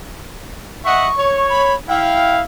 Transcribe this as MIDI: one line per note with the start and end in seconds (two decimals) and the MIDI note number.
0.85 1.08 75
0.85 1.08 76
0.85 1.08 78
0.85 1.47 85
1.18 1.74 73
1.50 1.75 83
1.88 2.41 64
1.88 2.41 77
1.88 2.36 79